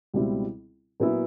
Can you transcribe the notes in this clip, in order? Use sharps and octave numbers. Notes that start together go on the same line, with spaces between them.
C#2 B2 G3 C4 E4
A#2 F#3 B3 E4